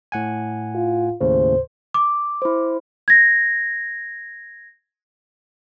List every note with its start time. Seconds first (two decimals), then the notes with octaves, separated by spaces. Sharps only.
0.12 A2 F#5 G#5
0.75 F4
1.21 D#2 A2 C#3 C5
1.94 D6
2.42 E4 C5
3.08 G#6 A#6